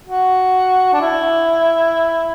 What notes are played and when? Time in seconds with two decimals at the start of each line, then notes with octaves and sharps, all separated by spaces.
0.05 F#4
0.93 D4
1.01 E4